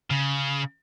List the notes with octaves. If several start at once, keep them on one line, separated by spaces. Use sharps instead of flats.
C#3